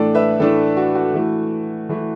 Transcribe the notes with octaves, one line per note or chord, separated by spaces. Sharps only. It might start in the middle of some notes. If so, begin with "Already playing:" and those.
Already playing: A2 E3 A3 D4 A4 D5
B4 E5
A2 E3 A3 D4 A4
F#4
F#4
E3 A3 E4
E3 A3 E4